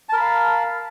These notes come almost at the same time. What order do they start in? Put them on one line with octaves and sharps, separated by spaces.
A5 A#4 B5 F5